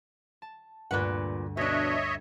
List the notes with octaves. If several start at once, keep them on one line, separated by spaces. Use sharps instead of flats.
A5
D2 G2 A#2 B4 F#5
B2 D4 C#5 D#5 E5